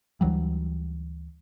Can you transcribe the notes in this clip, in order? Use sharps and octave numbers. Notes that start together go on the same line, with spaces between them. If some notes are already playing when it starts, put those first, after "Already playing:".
D2 E3 F#3 G3